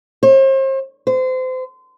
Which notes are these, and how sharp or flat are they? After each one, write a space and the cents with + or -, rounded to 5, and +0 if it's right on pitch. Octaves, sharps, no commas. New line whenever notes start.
C5 +40
C5 -30